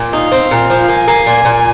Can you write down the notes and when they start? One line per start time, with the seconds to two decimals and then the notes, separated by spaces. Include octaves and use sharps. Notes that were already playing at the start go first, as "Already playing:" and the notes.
Already playing: A#2
0.13 D#4 F5
0.32 C4
0.51 A#2
0.70 F3
0.89 A#3 G#5
1.08 A#3
1.26 A#2 G#5
1.45 A#2